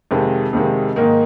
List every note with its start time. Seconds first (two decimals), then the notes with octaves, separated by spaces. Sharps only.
0.11 F2 C3 D#3 G#3
0.53 F2 C3 D#3 G#3
0.96 G#2 D#3 A#3 D#4